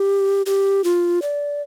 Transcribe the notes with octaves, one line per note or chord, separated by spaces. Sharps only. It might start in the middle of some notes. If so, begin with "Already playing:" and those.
Already playing: G4
G4
F4
D5